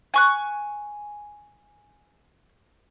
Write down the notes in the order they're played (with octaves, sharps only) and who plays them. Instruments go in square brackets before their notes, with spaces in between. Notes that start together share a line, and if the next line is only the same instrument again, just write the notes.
[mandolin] G#5 C#6 F#6